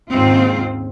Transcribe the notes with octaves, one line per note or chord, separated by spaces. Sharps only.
D#2 G#2 C#3 C4 F4